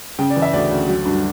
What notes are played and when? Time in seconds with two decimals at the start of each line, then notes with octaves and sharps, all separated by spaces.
0.19 C#3 G5
0.30 D5
0.36 E3
0.42 E5
0.53 D2 D5
0.71 D2
0.88 F#3
1.05 G2